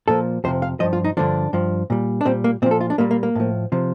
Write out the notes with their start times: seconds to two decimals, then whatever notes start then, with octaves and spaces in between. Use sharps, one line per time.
0.08 A#2 F3 A4
0.44 F2 C3 F3 C5
0.62 F5
0.80 G2 F3 D#5
0.93 F4
1.04 D#4
1.17 G2 D3 F3 D4
1.53 G2 F3
1.90 A#2 G3
2.21 D4
2.25 A#2 G3 C4
2.44 A#3
2.62 A#2 C4
2.66 F3
2.71 A4
2.81 F4
2.90 D4
2.98 A#2 G3 A#3
3.11 A#3
3.23 A#3
3.35 A2 F3
3.72 C3 F3